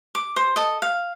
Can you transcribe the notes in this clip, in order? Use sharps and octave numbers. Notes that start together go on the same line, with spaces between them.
D6
C5
A4 D#5
F5